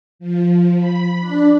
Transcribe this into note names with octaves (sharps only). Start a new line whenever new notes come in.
F3
B5
D4